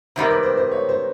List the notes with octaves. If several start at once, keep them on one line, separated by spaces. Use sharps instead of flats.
C3 D#3 G3 C4 A#4
B4
C5
C5
C#5
C5